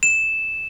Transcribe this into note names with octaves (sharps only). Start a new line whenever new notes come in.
E7